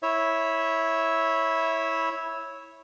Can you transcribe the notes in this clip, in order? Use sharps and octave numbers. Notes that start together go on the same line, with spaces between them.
E4 C#5 E5